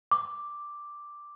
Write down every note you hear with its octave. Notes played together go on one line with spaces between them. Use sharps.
D6